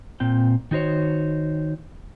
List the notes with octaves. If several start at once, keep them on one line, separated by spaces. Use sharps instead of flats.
A#2 C4 G5
D#3 D#4 F#4 C5 C#5